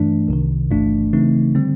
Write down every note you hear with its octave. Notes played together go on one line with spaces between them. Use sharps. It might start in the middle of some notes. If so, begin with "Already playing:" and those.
Already playing: G2 E3 A3 D4
C2 C3 D#3
G1 G2 E3 A3 D4
C#3 E3 A3 C4 D#4
D3 G3 C4